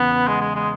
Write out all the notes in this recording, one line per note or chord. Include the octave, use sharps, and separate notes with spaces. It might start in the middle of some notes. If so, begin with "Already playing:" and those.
Already playing: E2 C#3 B3
G#3
G#3
G#3